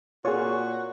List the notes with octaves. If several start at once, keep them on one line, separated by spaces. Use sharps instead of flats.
A#2 F4 F#4 G#4 C#5 C#6